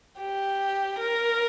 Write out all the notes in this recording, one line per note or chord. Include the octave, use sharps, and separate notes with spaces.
G4
A#4